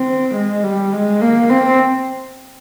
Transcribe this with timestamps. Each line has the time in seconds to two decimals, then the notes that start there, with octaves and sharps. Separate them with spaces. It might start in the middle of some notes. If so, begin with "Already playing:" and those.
Already playing: C4
0.35 G#3
0.64 G3
0.93 G#3
1.22 A#3
1.49 C4